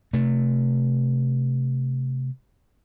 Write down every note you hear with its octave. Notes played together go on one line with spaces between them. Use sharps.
C3 A3